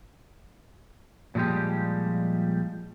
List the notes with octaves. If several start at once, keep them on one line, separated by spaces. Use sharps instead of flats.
A#2 F3 G3 G#3 G4